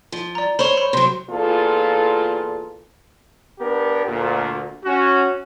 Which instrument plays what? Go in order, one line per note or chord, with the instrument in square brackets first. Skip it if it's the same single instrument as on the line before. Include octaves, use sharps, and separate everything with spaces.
[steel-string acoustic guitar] F3
[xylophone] D5 A#5
[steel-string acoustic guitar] C5 C#5 [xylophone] B5 C#6
[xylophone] B5
[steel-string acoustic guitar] C3 F#3 [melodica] C5
[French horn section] E2 A#2 F4 A4
[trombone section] B3 D4 G4 A#4
D2 A#2
C#4 F#4